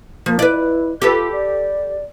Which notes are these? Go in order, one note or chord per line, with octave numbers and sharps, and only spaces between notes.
F3 A#3
E4 B4 D5
F4 G4 A4 B4
D5